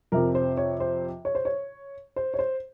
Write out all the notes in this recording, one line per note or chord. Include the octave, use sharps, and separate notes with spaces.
F2 C3 F3 A#4
C5
C#5
C5
C#5
C5
C#5
C5
C#5
C5